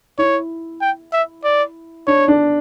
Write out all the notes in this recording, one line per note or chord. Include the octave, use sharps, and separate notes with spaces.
E4 C#5
G5
E5
D5
D4 C#5
D4